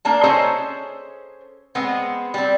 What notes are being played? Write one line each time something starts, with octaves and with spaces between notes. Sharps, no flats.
A#3 D4 A5
C#4 G#4 A4 C5 C#5 D#5
G#3 B3 C4
G3 C4